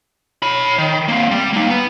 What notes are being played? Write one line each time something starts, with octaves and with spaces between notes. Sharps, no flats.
C#5 B5
D#3
A#3 C4
G3
A#3 D#4
B3